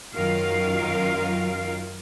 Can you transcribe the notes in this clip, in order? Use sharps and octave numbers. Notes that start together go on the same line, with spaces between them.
F#2 D#3 F#3 F4 A#4 F5